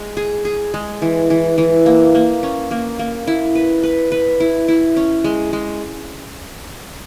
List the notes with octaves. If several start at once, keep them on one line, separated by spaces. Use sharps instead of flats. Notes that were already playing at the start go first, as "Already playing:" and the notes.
Already playing: G#3
G#4
G#4
G#3
E3
E3
E3
A#3
A#3
C#4
A#3
A#3
E4
B4
B4
B4
E4
E4
C#4
G#3
G#3